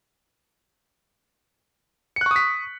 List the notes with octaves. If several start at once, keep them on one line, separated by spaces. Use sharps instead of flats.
C#6 D#6 F#6 B6 C#7